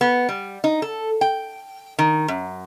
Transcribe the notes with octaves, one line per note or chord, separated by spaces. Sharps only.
B3
G3
D#4
A4
G5
D#3
F#2